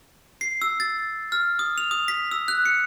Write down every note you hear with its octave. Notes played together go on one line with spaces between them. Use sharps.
C7
E6
A6
F6
D#6
F7
D#6
B6
E6
F#6
C#7